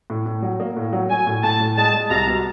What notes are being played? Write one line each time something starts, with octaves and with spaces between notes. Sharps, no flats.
A2
A2
F#3
A#3
A2
F#3
F#3 G#5
A2
A2 A5
A2
G#3 A5
G#3
C2 A#5
B2